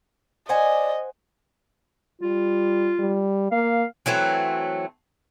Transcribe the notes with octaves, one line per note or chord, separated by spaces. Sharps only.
C5 D5 D#5 F#5 G#5
G3 F4
G3
A#3 F5
E3 F#3 A3 C4